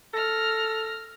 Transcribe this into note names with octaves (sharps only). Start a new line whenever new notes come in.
A4 F6 A#6